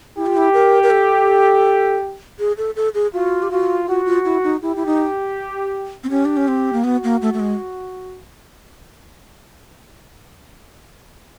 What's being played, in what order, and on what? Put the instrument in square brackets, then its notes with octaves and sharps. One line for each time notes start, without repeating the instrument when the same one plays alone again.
[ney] E4 [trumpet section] G4
[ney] F4
E4
A#4
A#4
A4
G#4
A4
A4
G#4
[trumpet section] F4 [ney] F#4
[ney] G4
[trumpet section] F4 [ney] F#4
[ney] F4 [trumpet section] F#4
[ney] F4
E4
D#4
[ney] E4 [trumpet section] G4
[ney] E4
D#4
C4
[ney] C#4 [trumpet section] G4
[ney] D4
C#4
C4
A#3
[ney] B3 [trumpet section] F#4
[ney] A#3
A3
A3
G#3